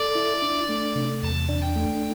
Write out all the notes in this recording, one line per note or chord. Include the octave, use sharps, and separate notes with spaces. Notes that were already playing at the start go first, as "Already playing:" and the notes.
Already playing: A4 D5
E4
D4
A3
C3
E2 A5
D4
G5
A3